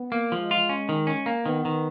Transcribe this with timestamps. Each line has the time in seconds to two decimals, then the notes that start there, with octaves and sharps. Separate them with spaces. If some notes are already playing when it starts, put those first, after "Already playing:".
Already playing: B3
0.12 A#3
0.32 F3 G#3
0.51 F4
0.69 C#4
0.89 D#3
1.07 C#4
1.26 A#3
1.45 D#3 B3
1.65 D#3